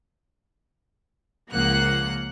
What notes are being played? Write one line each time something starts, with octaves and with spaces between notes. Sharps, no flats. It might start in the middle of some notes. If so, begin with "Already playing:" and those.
C#2 F3 A#3 F#5 F#6